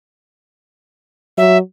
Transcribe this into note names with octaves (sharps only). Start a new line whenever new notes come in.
F#3 E5